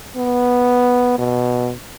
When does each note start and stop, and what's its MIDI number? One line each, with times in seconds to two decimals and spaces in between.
0.17 1.17 59
1.19 1.72 47